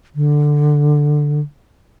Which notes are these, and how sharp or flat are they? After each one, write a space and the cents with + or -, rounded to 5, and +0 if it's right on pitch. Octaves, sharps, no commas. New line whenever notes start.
D3 +5